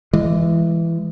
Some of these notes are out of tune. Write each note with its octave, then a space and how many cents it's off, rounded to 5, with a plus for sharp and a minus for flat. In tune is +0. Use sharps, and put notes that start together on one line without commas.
E3 +15 G#3 -15